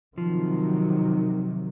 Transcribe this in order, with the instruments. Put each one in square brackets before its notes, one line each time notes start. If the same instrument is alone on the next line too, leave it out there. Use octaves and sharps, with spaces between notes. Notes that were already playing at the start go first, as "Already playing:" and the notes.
[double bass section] C3 D#3 F#3 [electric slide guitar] F3